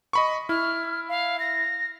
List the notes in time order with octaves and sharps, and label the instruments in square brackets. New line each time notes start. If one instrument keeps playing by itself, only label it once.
[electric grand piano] D#5 B5 C#6
[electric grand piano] E4 [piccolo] F6
[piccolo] F5
A#6